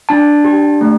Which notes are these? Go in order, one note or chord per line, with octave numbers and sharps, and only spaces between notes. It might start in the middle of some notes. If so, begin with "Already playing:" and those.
D4 A5
G4
A3